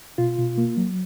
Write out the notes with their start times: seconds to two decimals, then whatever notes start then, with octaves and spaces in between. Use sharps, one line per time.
0.18 B2 F4
0.38 B2
0.58 A#3
0.77 F#3